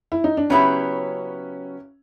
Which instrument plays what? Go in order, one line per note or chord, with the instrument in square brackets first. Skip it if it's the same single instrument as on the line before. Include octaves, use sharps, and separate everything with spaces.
[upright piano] E4
D#4
D4
[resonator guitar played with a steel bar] C#3 F#3 B3 E4 G4 [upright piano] C#4